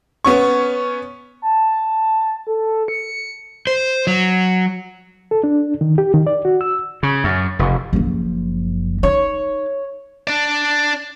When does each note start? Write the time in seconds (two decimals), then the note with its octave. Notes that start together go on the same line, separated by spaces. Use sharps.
0.25 B3 C#4 C#6
1.42 A5
2.47 A4
2.88 C#7
3.67 C5
4.07 F#3
5.31 A4
5.44 D4
5.81 D#3
5.98 G4
6.14 D#3
6.27 D5
6.45 F#4
6.61 E6
7.03 C#3
7.24 F#2
7.59 F1
7.93 F#1 F3
9.03 D#4 C#5
10.27 D4 D5